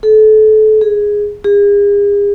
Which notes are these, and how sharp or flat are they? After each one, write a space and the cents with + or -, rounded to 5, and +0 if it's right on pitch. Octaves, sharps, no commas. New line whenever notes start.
A4 -30
G#4 -5
G#4 -40